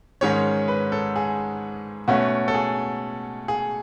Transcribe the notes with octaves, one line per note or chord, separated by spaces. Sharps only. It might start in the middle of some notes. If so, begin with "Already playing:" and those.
G#2 D#3 G#3 C#4 C#5
B4
A4
G#4
B2 A3 C#4 F#4
A4
G#4
G#4